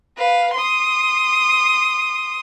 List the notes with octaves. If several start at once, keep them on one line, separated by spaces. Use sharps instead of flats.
B4 F5
C6 D#6